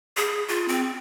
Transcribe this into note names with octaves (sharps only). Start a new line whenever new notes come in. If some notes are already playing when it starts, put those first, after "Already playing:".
G#4
F4
C4